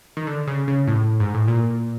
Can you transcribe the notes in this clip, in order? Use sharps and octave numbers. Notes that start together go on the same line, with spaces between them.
D#3
D3
C#3
C#3
A2
G#2
A2
A#2